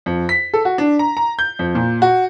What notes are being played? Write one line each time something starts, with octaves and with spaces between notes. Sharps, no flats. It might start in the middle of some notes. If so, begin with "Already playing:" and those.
F2
B6
A4
F#4
D4
A#5
A#5
G6
F2
A#2
F#4